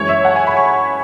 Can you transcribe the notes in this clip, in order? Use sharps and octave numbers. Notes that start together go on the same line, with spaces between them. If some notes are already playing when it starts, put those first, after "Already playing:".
Already playing: F#2 E3 G#3 C#5
E5
F#5
G#5
B5
C#6